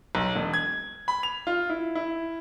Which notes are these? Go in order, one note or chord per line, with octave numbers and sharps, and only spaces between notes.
B1
E1
G#6
B5
F7
F4
E4
E4